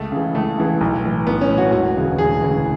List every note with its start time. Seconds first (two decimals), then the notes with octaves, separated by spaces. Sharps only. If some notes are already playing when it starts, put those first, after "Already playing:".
Already playing: C#2 A3
0.12 C#3 E3
0.35 C#2 A3
0.58 C#3 E3
0.81 B1
1.04 A2 E3
1.27 B1 B3
1.41 C#4
1.50 A2 E3
1.58 F#4
1.72 E1 F#4
1.95 D2 C#3 E3
2.18 E1 G#4
2.42 D2 C#3 E3